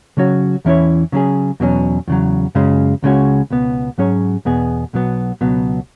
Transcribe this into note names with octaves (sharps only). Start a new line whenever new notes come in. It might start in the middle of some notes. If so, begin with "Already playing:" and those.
C#3 F#3 C#4 F#4 C#5
E2 E3 C#4 E4 C#5
C#3 F#3 C#4 G#4
E2 B2 F#3 C#4
E2 C#3 F#3
F#2 C#3 G#3 C#4
C#2 C#3 G#3 C#4 F#4
C#2 B2 B3
G#2 F#3 C#4 G#4 C#5
E2 B2 B3 G#4
B1 B2 F#3 B3
C#2 B2 F#3 B3